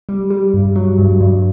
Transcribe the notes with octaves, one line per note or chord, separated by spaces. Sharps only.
G3
G3
G2
F#3
G2
G2